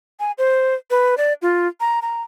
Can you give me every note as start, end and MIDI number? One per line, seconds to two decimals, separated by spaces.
0.20 0.32 80
0.38 0.75 72
0.91 1.15 71
1.18 1.33 74
1.42 1.68 65
1.80 2.00 82
2.02 2.22 82